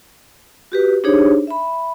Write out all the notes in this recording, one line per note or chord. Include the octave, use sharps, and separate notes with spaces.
F#4 G4 B4
D4 D#4 G4 G#4 C5 C#5
E5 B5